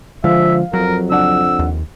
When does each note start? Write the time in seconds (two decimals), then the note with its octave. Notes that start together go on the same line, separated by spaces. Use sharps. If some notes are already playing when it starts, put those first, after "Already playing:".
0.24 D3 F3 G#3 E5 F5
0.74 F2 F#3 A#4
1.10 C#2 D4 F#5 E6
1.59 D#2